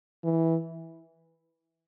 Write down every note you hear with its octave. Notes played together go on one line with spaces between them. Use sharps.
E3